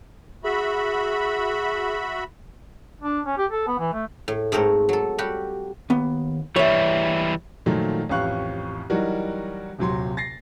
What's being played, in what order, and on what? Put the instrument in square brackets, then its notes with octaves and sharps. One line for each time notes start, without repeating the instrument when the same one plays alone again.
[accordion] F#4 E5 B5 [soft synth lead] G#4
[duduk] D4
C#4
G4
A4
B3
E3
A3
[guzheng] A2
G#2 A3 C4 A#4 C#5
F#3 A4
G3 F#4 G4
[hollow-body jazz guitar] D#2 B3
[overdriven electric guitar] E3 G3 [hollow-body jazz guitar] C#5 E5
[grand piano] A#2 D#3 F3 F#3 A3
A1 F2 G4 F5 C#6 F#6
E3 F#3 G3 D#4 F#4 A#4
D#1 C3 F#3 C6
A6 A#6 C7